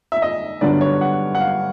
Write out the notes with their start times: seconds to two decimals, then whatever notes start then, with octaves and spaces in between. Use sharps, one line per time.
0.12 E5
0.22 D#5
0.61 G2 D3 F#3 B3 D4 D5
0.81 C#5
1.01 F#5
1.35 F#5
1.40 F5